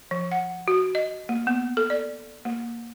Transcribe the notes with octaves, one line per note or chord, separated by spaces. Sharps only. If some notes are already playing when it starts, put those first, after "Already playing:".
F3
F#5
F#4
D#5
A#3
B3
A4
D5
A#3